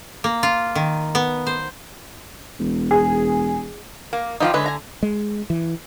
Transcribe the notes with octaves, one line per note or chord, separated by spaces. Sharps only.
A#3
F4
D#3
B3
C5
E1
G#4
A#3
E2 F3 D#4 F4 G4 G5
D3 G#3 B4 C#5
G#5 A#5
G#3
E3